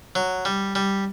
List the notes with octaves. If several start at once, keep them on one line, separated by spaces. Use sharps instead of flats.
F#3
G3
G3